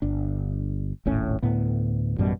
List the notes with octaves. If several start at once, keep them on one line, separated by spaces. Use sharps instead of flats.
G1 D4
D#1 G#1 A2 C#4
D2 A2 B3
A1 F#2 B2 G3